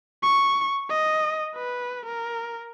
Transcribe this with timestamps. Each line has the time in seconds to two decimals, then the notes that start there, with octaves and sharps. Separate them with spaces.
0.23 C#6
0.90 D#5
1.56 B4
2.06 A#4